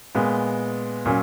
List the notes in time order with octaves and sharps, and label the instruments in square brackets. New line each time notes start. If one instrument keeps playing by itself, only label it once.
[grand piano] A#2 G#3 B3
A#2 F#3 C#4